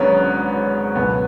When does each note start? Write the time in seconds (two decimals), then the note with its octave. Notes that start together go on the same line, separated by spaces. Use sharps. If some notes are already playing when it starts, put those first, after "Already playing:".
Already playing: G#1 G#2 F#3 B3 C#4 D4
0.95 C#2 B2 F#3 B3